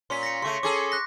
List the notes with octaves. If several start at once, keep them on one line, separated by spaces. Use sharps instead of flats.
A#2 C#4 C6 B6
A#6 C#7
C#3 A3 C6 C#6
C#4 G#4 A4 C#6 D6
F#6 A#6